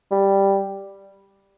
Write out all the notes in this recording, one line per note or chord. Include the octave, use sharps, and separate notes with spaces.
G3